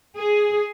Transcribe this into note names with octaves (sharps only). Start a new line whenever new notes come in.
G#4